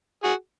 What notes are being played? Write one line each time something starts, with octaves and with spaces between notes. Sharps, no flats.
F#4 G#4